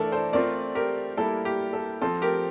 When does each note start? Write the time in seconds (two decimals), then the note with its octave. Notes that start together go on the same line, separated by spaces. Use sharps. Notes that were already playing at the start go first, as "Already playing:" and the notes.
Already playing: E3 A3 D4 A4 A#4 D5
0.12 A4 C5
0.33 A3 C4 F4 A#4 D5
0.75 G4 A#4
1.17 G3 A#3 E4 A4
1.45 G4
1.73 A4
2.01 F3 C4 F4 A4
2.22 G4 A#4